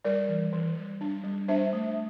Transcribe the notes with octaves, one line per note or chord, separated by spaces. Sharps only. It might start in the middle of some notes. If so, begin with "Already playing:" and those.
G3 A#4 D5
E3
E3
G3
D4
G3
D4 C5 E5
A3